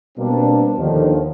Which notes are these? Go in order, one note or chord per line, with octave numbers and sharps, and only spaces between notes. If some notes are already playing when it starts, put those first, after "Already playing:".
B2 G3 A#3 C4 D4
D#2 D3 D#3 F3